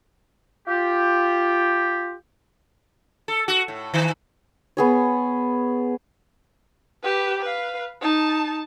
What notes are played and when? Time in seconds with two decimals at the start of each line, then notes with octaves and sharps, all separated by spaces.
0.68 F4 G4
3.28 A4
3.48 F#4
3.68 A2
3.94 D#3
4.77 B3 G#4 C#5
7.03 G4 B4
7.41 B4 F5
8.01 D#4 A5